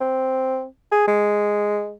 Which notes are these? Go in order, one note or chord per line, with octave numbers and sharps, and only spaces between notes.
C4
G#4
G#3